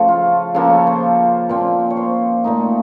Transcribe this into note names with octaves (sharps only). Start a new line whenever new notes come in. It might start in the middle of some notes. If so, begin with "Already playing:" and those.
Already playing: C#3 F3 A3 A4
F4
C#3 F3 A#3 A4
C#5
C5
A#2 F3 C4
C#5
C5
A#2 A3 D#4